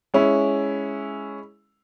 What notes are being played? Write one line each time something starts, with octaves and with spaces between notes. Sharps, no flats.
G#3 C#4 E4